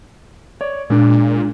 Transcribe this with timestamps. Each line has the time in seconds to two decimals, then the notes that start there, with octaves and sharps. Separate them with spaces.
0.61 C#5 D5
0.90 A#2 G#3 D4